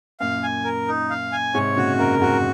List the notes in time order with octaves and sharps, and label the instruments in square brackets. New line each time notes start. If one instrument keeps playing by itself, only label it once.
[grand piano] F#2 A#2 [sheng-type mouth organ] F5
[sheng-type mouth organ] G#5
A#4
D#4
F5
G#5
[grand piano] G#2 C3 [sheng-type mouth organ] C#5
[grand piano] A#2 C#3 [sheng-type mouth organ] F#4
[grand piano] F#2 [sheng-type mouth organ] A#4
[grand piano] F2 G#2 [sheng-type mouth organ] F#4